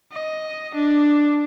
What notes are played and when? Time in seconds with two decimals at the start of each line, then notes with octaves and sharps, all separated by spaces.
0.12 D#5
0.74 D4